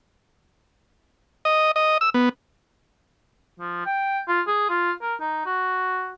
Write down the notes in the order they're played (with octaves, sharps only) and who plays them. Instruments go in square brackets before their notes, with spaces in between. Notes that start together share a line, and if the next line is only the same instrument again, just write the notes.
[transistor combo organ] D#5
D#5
E6
B3
[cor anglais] F3
G5
F4
G#4
F4
A#4
D#4
F#4